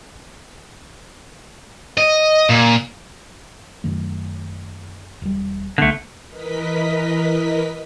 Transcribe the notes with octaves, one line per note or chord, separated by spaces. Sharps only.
D#5
A#2
F#2 D#3 A3
E1 G3
C2 D3 A3 B3
E3 A#4 B4 D#5 B6